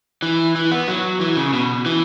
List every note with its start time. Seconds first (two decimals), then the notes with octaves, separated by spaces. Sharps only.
0.22 E3
0.55 E3
0.71 B3
0.88 F#3
1.21 E3
1.36 C#3
1.53 B2
1.86 E3